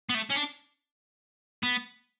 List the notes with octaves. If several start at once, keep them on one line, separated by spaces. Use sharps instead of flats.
B3
A3
C#4
D4
B3